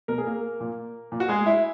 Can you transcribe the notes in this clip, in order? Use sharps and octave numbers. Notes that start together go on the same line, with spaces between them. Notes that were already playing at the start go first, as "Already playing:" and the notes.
B2 A#4
G#4
A#3 A#4
A#2
A#2
F#4
G#3 G#4
E4